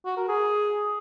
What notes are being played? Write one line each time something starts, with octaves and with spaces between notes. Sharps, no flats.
F#4
A#4
G#4